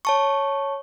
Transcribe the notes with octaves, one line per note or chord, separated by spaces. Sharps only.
C#5 A5 C#6